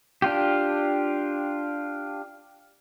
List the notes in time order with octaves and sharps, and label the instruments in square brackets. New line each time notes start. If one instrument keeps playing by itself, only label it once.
[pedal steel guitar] D4 F4 G4